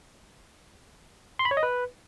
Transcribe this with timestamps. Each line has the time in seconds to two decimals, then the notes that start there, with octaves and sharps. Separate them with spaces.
1.39 C6
1.45 B5
1.51 C#5
1.57 D#5
1.63 B4